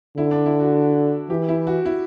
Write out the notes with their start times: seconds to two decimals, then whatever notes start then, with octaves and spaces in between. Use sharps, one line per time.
0.17 D3 E4
0.31 D4
0.46 E4
0.60 F#4
1.30 E3 G4
1.49 E4
1.67 F#4
1.86 E4